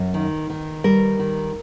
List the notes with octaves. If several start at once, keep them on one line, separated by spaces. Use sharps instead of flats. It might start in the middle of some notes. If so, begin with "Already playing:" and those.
Already playing: F#2
D#3
D#3
G3 A#4
D#3